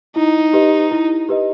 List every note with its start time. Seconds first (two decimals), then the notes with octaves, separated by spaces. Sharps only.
0.16 D#4 E4
0.53 G4 B4 D#5
0.91 E4
1.29 G4 B4 D#5